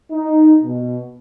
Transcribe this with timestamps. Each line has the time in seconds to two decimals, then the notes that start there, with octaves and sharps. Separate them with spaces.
0.12 D#4
0.63 B2